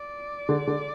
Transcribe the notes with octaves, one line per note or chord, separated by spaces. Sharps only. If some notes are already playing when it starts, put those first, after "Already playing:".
Already playing: D5
D3
D3